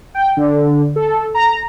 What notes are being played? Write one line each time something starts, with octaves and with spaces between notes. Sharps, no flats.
G5
D3
A4
A#5